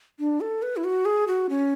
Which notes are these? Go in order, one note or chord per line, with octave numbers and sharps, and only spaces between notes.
D4
A4
B4
E4
F#4
G#4
F#4
C#4